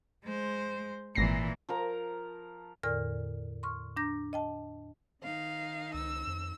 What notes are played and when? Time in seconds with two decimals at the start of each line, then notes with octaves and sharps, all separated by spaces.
0.24 G#3 C5
1.15 G#1 A#2 E3 A#6 C7
1.69 F3 A#4 A#5
2.83 E2 A2 D3 A#4 D5 F6
3.63 C6 C#6 F6
3.97 D4 A#5 G6 A#6
4.33 D#5 G5 A5
5.23 D#3 D#4 F5
5.94 C#2 E6
6.27 F2